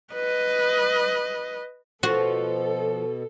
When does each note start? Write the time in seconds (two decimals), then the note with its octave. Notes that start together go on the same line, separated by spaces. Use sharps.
0.14 B4 D#5
2.03 B2 F3 F4 F#4 A4